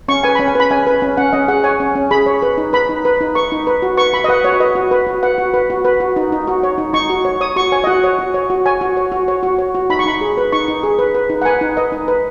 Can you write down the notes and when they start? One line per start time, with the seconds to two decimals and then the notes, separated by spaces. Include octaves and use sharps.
0.08 C#4 C#6
0.23 B4 G#5
0.35 C#4 B5
0.48 G#5
0.55 B4 B5
0.70 C#4 G#5
0.87 B4
1.02 C#4
1.17 C#4 F#5
1.32 C#4 D#5
1.48 G#4 F#5
1.64 C#5 G#5
1.80 C#4
1.96 C#4
2.11 G#4 B5
2.26 C#5
2.42 B4
2.58 D#4
2.73 B4 B5
2.89 D#4
3.05 B4
3.21 D#4
3.35 B4 C#6
3.52 D#4
3.67 B4
3.82 F#4
3.97 B4 C#6
4.13 F#4 B5
4.24 D#5
4.28 B4 F#5
4.44 F#4 C#5
4.60 B4 D#5
4.75 F#4
4.91 B4
5.07 F#4
5.23 B4 F#5
5.38 F#4
5.54 B4
5.70 F#4
5.85 B4
6.00 F#4
6.16 D#4
6.32 D#4
6.47 F#4
6.63 C#5
6.78 D#4
6.93 D#4 C#6
7.10 F#4
7.25 C#5
7.41 C#5 D#6
7.56 F#4 C#6
7.72 C#5 G#5
7.84 D#5
7.87 F#4 F#5
8.04 C#5
8.19 F#4
8.34 C#5
8.50 F#4
8.66 C#5 G#5
8.81 F#4
8.97 C#5
9.12 F#4
9.28 C#5
9.43 F#4
9.59 C#5
9.75 F#4
9.90 D#4 B5
9.99 C#6
10.06 D#4 B5
10.21 G#4
10.37 B4
10.52 D#4 C#6
10.68 D#4
10.83 G#4
10.99 B4
11.15 B4
11.30 D#4
11.42 F#5
11.45 B4 G#5
11.61 D#4
11.77 B4 D#5
11.92 D#4
12.08 B4